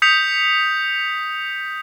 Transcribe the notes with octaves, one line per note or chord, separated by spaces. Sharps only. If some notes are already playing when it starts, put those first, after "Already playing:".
D#6 G6 B6 C#7 F7